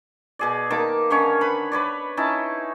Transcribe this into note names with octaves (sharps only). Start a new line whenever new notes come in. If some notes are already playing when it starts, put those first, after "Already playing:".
B2 G#4 D5
D#3 A#3 A5 D6
D3 D#3 C#4 C#5
B4 B5
B4 C#5 D5
C#4 D#4 E4 A5